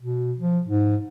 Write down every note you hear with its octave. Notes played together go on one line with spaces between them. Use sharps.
B2
F3
G#2